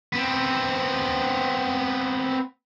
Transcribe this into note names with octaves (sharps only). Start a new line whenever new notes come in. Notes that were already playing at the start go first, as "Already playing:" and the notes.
B3 C4